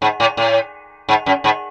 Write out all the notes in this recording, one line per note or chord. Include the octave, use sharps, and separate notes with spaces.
G#2
A2
A2
G#2
F#2
G#2